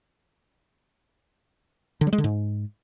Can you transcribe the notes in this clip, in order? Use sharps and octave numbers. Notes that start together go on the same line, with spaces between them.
D3
G3
G#3
D3
G#2